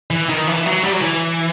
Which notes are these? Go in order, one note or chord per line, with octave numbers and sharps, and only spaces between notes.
E3
D#3
E3
F#3
G3
F#3
E3